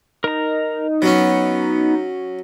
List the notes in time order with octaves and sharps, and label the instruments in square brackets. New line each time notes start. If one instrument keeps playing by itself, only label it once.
[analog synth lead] D#4 [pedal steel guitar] A#4 A#5
[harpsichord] F#3 C#4 [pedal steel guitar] B3